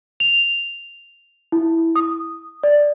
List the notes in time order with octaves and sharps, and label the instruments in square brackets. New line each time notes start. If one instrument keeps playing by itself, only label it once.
[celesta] F7
E4
D#6
D5